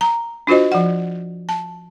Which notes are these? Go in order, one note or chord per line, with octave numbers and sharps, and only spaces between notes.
A#5
D4 F4 F#4 C5 D#5
F3 F#5
A5